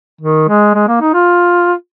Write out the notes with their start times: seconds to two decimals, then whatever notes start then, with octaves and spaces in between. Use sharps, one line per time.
0.21 D#3
0.49 G#3
0.75 G#3
0.88 A#3
1.01 D#4
1.14 F4